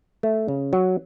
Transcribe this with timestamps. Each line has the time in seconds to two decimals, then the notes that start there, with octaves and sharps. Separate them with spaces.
0.23 A3
0.48 C#3
0.73 F#3